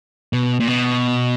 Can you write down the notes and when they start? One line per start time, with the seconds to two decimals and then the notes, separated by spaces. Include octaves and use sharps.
0.33 B2
0.60 A#2
0.67 B2